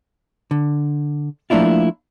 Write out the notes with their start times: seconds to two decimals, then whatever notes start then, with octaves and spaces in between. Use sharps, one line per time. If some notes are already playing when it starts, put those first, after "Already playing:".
0.51 D3
1.50 F3 A3 A#3 D4 E4 F4